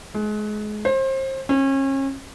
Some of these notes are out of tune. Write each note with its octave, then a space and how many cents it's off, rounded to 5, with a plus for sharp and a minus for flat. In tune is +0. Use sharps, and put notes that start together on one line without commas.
G#3 +30
C5 +30
C#4 -35